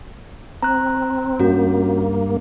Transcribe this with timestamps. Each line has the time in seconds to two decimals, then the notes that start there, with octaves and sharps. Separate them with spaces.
0.63 C4 A#5 F#6
1.40 G2 A#3 C#4 F#4